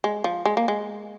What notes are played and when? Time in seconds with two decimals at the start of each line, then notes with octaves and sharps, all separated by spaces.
0.04 G#3
0.24 F3
0.45 G#3
0.57 A#3
0.68 G#3